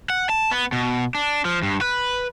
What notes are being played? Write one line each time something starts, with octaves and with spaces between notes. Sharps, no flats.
F#5
A5
B3
B2
D4
F3
G2
B4